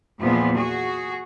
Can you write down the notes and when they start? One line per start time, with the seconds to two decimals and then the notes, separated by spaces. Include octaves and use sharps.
0.21 E2 A#2 F3 B3
0.57 F#4 G#4